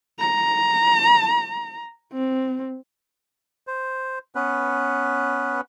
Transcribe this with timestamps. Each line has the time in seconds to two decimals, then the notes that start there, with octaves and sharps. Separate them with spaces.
0.19 A#5
2.13 C4
3.67 C5
4.35 B3 C#4 B4